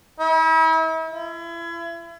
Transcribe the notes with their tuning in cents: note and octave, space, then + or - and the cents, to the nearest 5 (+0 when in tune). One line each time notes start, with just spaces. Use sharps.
E4 -40
E4 +35